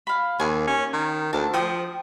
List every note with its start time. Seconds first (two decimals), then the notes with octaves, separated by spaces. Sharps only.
0.07 F5 B5
0.40 D#2 G#5
0.67 C#4
0.93 D#3
1.33 D2 A5
1.54 F3 G5 D#6